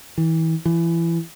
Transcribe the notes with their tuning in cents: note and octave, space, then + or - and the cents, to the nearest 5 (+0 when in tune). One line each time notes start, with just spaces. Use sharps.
E3 -30
E3 +25